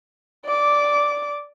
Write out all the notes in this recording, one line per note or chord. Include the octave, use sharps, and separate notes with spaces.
D5 D6